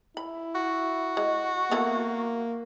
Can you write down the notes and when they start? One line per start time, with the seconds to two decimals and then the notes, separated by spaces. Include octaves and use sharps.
0.17 E4 B5
0.55 F#4
1.17 G#3
1.71 A#3 B3 E4 A4